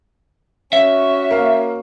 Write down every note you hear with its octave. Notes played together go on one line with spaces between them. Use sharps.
C#4 F#4 E5
A#3 F5